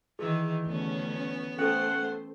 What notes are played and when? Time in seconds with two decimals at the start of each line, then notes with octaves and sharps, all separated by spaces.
0.19 D#3 E3 G#4
0.67 D2 B3 C#4
1.59 A3 C#4 A4 C5 F#5